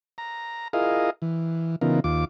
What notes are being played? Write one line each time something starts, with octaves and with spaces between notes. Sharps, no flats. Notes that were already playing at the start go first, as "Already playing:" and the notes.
A#5
E4 F4 G#4 A#4 D#5 F5
E3
C#3 E3 B3 D#4 F4 A#4
D#2 F4 D6